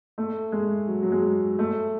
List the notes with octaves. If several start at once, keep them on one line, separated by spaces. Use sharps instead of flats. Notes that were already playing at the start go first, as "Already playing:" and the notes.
A3
G#3
F#3
F#3
G#3
A3